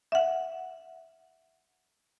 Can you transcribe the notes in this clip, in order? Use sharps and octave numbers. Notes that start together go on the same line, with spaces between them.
E5 F#5